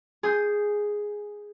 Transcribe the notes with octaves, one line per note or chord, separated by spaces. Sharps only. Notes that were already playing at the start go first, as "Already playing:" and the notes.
G#4 D#6 G6